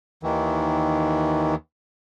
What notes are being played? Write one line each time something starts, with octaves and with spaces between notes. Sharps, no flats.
D#2 D#3 E3